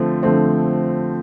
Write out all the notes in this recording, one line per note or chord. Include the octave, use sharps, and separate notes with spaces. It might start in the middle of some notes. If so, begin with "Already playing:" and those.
Already playing: D3 F3 A3 C4
D3 F3 A3 C4